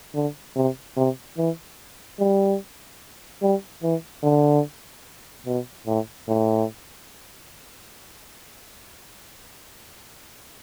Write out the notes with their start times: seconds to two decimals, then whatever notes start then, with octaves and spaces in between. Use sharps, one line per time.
0.14 D3
0.56 C3
0.96 C3
1.37 E3
2.19 G3
3.42 G3
3.83 E3
4.23 D3
5.46 B2
5.87 A2
6.28 A2